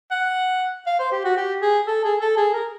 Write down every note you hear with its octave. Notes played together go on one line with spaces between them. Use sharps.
F#5
F5
C5
G4
F#4
G4
G#4
A4
G#4
A4
G#4
A#4